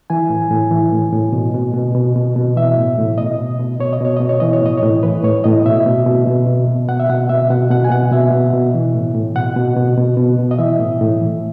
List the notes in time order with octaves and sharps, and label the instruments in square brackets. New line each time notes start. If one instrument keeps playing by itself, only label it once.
[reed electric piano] E3 G#5
A2
A2
E3
A2
A2
B2
B2
B2
B2
B2
B2
E3 E5
A2
A2
B2 D#5
B2
B2
B2 C#5
D#5
B2 C#5
B2 D#5
C#5
E3 D#5
C#5
A2 D#5
C#5
A2
E3 B4
A2 C#5
A2 D#5
B2 E5
B2
B2
B2
B2
B2
B2 F#5
E5
B2 F#5
B2 E5
B2 F#5
B2 F#5
G#5
B2 F#5
B2 E5
B2
B2
E3
A2
A2
B2 F#5
B2
B2
B2
B2
B2
D#5
E3 E5
A2
A2
E3